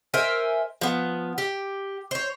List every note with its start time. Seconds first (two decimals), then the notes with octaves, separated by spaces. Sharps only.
0.14 A#4 C5 E5 G#5
0.81 F3 B3
1.38 G4
2.11 C5 C#5